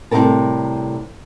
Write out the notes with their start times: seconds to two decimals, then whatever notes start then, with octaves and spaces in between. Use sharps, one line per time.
0.11 A2 C3 D#3 G3 A#4 A5